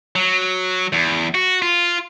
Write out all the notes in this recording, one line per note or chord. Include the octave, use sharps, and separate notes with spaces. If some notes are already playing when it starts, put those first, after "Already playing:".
F#3
E2
F#4
F4